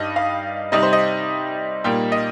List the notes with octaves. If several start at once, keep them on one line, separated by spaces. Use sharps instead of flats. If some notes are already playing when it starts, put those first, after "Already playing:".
Already playing: G2 G3 D#4 D#5
F5
C3 G3 D#4 D#5
C5
D#5
A#2 G3 A#3 D#4 G5
D#5